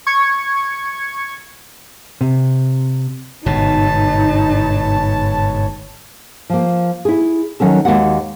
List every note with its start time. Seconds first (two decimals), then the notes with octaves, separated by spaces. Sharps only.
0.07 C#6 G#6 C#7
2.21 C3
3.46 G1 G#2 B2 D#4 G#4 B4 C#5 A5
6.50 F3 A#3
7.05 E4 G#4
7.60 D#3 F#3 C#4 A4
7.85 D#2 F3 G#3 A#3 F#4 F#5